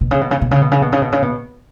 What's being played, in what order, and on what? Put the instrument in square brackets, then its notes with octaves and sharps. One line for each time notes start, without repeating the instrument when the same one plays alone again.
[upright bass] B2
C#3
B2
C#3
B2
C#3
B2
C#3
B2
C#3
B2
C#3
B2